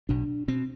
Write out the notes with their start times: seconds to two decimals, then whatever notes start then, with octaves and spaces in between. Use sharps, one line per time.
0.09 B1 B2 D4
0.48 B2 C4